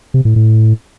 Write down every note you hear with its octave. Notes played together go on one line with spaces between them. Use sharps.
C3
A2
A2